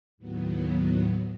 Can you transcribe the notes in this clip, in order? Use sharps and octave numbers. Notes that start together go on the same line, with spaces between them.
D#2 A2 F#3 B3